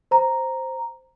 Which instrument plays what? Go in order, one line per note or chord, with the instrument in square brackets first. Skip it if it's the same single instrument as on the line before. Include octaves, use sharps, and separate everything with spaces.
[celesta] C5 A#5